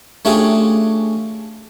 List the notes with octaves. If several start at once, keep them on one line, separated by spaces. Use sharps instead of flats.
A3 C#4 D4 F4 G4 G#4